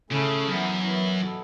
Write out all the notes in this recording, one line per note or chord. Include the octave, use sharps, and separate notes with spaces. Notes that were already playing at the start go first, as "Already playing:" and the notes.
C#3 A3 C#4 E4 A4
F#2 E3 B3 E4
E3 B3 E4
B2 B3 E4 A4